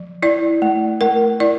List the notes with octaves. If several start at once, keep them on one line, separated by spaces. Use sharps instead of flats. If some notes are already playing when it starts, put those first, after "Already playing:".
Already playing: F3
E4 D5
A3
A3 A#4
E4 D5